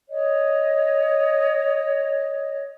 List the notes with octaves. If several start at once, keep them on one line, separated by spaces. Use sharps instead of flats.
C#5 D#5